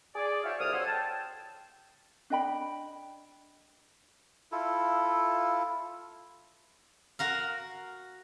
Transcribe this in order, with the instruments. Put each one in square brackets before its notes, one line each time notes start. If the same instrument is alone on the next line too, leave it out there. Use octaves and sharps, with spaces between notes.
[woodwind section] G#4 D5
E4 F#4 C5 C#5 E5 F5
C2 F2 G#4 D#6 F6
F2 D3 C#5 F#5 C6 E6
G5 A5
[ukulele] D4 D#5 G5 B5
[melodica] E4 F4 A4
[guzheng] F#4 A#4 F5